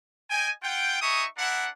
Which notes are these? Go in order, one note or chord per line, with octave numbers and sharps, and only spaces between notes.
D#5 G5 G#5
F4 F#5 G5
D#4 G#4 E5 C#6 D#6
D4 E4 A#4 F#5